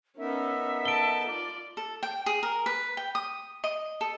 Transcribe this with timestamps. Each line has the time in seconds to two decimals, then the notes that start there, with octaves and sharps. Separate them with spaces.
0.18 B3 C#4 D#4 A#4 E5
0.85 A4 A5 D7 G7
1.28 F4 D5 D6
1.77 A4
2.03 G5
2.26 G#4
2.43 A#4
2.66 B4
2.97 G5
3.15 D#6
3.64 D#5
4.01 A4